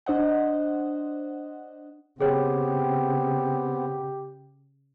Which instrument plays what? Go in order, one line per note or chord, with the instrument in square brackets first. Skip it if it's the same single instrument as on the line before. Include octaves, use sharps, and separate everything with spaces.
[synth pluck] D4 C5 D#5 F#5
[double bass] C#3 [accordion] B3 C4 [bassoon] G4 [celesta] G#4 C#5